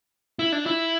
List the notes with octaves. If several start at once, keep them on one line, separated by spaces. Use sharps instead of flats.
E4
D4
E4